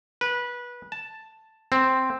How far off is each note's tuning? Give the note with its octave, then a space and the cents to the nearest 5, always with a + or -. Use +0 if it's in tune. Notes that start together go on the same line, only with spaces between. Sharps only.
B4 -20
A5 +5
C4 +0